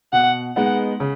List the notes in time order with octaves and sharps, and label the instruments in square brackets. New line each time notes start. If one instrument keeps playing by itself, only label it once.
[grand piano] B2 [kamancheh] F#5
[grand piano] G#3 B3 D#4 [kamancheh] F#5
[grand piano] C#3